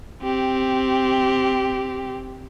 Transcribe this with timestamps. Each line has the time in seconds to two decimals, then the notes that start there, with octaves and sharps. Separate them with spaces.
0.23 C4 G4